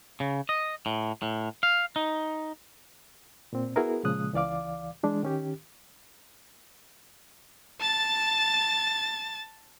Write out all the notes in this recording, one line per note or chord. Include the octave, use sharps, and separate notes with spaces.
C#3
D#5
A2
A2
F5
D#4
A#2 C4
B3 E4 F#4 G#4 A#4 B4
A#2 C#3 F3 G#3 D#6 F#6
C#2 E3 D5 F5 D6
E3 G#3 D4
D#3 C#4 G4
A5 A6